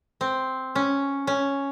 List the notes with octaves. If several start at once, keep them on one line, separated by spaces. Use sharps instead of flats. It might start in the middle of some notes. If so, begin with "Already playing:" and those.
C4
C#4
C#4